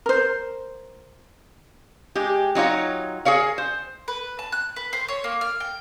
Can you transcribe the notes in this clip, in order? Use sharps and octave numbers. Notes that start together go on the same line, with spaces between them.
A#4 C5
G#3 G4
F#3 D#4 F4 C#5
G#4 A#4 C#5 F5
C5
B4
A5
F#6
B4
C5
C#5
A#3
F6
G5